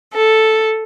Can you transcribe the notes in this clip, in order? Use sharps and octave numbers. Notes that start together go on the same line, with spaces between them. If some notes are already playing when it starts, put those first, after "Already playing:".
A4